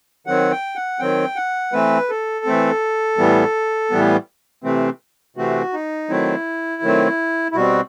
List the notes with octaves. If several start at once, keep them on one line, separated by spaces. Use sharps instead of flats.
D#3 F#3 C4 F#5
G5
F#5
D#3 F#3 C4 G5
F#5
E3 A3 C4 B4
A4
E3 A3 C4
A2 E3 G3 B3
A2 E3 G3 B3
C3 E3 A3 C4
C3 E3 A3 C4 F#4
D#4
D#3 F#3 A3 C4 E4
D#3 F#3 A3 C4
E4
B2 G3 C4 F#4